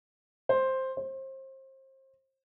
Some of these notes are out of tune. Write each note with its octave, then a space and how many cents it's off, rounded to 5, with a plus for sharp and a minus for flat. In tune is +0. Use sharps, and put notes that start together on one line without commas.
C5 +5
C5 +30